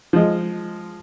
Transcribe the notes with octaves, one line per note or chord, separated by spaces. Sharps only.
F3 G#3